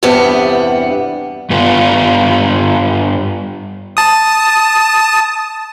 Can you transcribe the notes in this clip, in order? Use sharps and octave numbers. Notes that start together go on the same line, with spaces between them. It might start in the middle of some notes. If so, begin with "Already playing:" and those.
E2 G2 C3 G3 B3
G2 B3 F4
A5 D#6